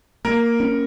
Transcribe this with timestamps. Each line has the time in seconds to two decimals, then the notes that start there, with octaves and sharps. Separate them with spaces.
0.24 A#3 A#4
0.60 C#4